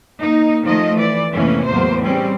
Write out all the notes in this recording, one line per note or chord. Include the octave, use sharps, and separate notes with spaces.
A#3 D#4
D#3 F3 A3 D#5
E3 D5
F2 A2 C3 E3 A#3 C#4
E2 A2 F#3 A#3 C5
G3 C4 C#4